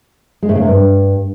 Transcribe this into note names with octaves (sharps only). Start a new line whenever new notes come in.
G#3
A2
C#3
C3
G2